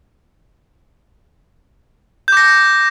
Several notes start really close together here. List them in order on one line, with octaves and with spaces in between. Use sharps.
G6 D6 A#6